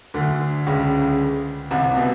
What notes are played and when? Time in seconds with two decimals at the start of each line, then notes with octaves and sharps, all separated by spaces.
0.14 D2 D3
0.66 C#2 C#3
1.71 C2 C3
1.97 B2